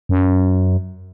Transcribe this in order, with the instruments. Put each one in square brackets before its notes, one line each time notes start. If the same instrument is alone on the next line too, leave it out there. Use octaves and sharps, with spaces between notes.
[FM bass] F#2